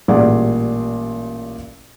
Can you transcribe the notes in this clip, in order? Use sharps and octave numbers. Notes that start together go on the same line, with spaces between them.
A1 A#2 G3 G#4 D5 F#5